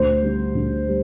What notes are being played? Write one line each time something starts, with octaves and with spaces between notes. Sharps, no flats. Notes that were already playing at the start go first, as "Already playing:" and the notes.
Already playing: D2 C5
D3 G3
D2
G3